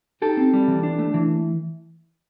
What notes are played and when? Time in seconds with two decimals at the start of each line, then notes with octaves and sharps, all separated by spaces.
0.22 D#4 G4 A4
0.37 C4
0.53 G3
0.68 E3
0.83 D4
0.99 A3
1.14 E3